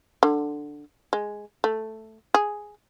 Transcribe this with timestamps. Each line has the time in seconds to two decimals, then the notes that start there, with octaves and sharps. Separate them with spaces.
0.23 D3
1.13 G#3
1.64 A3
2.34 G#4